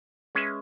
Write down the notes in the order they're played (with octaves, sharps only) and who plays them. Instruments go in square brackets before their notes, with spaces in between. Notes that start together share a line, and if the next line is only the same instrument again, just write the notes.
[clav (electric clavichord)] G#3 C#4 G#4 B4 E5